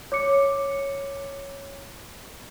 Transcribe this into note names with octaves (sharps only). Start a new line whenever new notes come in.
C#5 D6 C#7